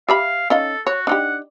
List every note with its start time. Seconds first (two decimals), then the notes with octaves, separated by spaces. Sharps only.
0.09 G4 E5 F5 B5
0.50 C#4 D#4 A4 F5
0.87 F#4 C#5
1.07 D4 D#4 G4 F#5